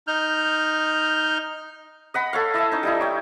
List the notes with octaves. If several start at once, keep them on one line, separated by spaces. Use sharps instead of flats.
D#4 F6 G6
D#5 F#5 B5
A4 C#5 F5
E4 D#5 E5 A5
C#4 D#4
G3 D#4 E4
C#5 G5